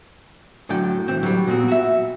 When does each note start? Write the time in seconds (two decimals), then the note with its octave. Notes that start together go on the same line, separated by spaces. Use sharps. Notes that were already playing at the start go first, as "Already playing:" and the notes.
0.69 A2 D3 F#3 D5 G5
1.08 E3 C4
1.23 F#3 G3
1.47 A#2 B3 C4 F#4
1.68 F#4 E5